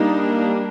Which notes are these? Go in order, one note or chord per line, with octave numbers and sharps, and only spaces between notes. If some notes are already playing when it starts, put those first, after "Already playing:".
Already playing: G3 A#3 D4 D#4